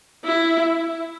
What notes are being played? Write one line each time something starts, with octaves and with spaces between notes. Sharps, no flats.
E4